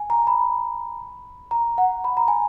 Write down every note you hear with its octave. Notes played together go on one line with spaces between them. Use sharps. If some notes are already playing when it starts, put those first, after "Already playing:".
Already playing: G#5
A#5
B5
A#5
F#5
B5
A#5
G#5